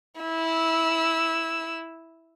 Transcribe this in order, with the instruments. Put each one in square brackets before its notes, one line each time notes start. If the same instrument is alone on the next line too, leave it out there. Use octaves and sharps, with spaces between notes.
[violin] E4 E6